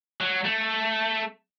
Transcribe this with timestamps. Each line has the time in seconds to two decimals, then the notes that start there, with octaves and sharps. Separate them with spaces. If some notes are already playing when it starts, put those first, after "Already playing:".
0.21 F#3
0.45 A3